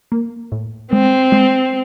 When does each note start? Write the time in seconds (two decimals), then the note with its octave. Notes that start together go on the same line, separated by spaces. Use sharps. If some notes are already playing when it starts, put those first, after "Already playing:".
0.12 A#3
0.52 A2
0.92 G#3 C4
1.32 G#3